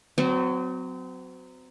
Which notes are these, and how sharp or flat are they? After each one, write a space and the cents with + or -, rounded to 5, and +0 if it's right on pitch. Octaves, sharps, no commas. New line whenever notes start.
F#3 +0 C4 -35